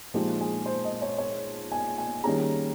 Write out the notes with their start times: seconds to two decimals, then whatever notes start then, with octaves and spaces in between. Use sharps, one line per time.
0.14 A#2 F3 G#3 D#4 G4
0.41 G#4
0.66 C5
0.84 D#5
1.02 C#5
1.18 C#5
1.72 G#5
1.98 G#5
2.24 D#3 G3 A#3 C#4 G#4 A#5